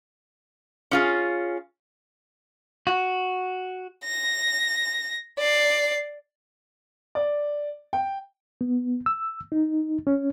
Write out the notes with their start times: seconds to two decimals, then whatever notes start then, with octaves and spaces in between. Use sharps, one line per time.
0.91 C#4 F4 G#4
2.87 F#4
4.05 A#6
5.39 D5 C7
7.15 D5
7.93 G5
8.61 B3
9.06 E6
9.52 D#4
10.07 C#4